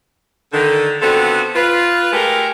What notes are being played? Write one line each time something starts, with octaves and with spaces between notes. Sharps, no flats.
D3 D#3
D3 B3 C4 F4 F#4 A4
F4 B4
G#3 A3 G4 A4 A#4